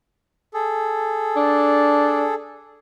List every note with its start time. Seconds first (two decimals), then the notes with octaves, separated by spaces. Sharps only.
0.54 G#4 A4
1.36 D4